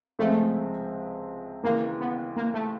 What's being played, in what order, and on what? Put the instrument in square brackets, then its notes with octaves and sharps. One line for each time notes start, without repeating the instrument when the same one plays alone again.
[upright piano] C#2 C3 F3 G#3 C4 [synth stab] A3
[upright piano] D#2 C#3 E3 [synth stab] A#3
[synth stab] B3
A#3
A3